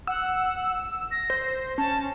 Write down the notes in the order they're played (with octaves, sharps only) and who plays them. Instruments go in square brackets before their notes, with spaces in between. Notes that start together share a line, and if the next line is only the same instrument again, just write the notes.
[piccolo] F#5 [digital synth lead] E6
[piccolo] A#6
[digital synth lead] C5
[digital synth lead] C#4 [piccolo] A5